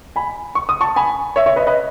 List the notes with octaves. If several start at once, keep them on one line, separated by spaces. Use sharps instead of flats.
G#5 B5
C#6
D#6
A5 C#6
G#5 B5
C#5 E5
C#5 E5
B4 D#5
B4 D#5